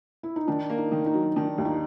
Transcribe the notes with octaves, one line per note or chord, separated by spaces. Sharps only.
E4
D#4
D#3 D4
A#3
D#4
D#3
D#4
F#3
D#3 D4
D#2
D#4